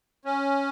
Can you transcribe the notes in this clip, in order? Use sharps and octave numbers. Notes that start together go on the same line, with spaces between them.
C#4